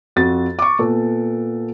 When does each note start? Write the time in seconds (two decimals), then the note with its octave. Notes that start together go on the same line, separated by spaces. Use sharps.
0.16 F2 F#4 A6
0.59 C#6 D6
0.79 A#2 B3 A4